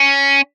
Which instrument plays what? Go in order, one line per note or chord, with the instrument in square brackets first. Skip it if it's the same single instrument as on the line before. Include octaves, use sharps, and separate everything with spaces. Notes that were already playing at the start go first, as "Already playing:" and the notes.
Already playing: [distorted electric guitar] C#4